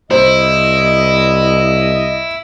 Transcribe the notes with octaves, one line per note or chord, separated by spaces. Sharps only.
C2 E4 C5 D#5